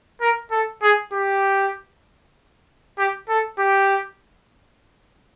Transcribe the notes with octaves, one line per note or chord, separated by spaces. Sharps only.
A#4
A4
G#4
G4
G4
A4
G4